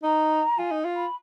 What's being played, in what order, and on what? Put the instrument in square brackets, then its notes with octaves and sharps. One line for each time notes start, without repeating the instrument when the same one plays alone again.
[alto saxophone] D#4 [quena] A#5
[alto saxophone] F4 [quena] G#5
[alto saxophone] D#4
F4
[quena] B5